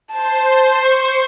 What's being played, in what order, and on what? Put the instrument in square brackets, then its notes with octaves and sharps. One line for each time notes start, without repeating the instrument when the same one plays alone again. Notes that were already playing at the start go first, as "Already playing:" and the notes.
[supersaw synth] C5 [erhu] A5
[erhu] C#6